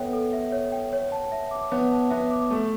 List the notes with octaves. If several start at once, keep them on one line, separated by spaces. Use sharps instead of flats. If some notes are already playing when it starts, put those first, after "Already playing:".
Already playing: B3 A4 C#5 E5 G5
A4
E5
C#5
G5
C#5
A5
E5
D6
B3 C#5
A5
B3 E5
D6
A3 A4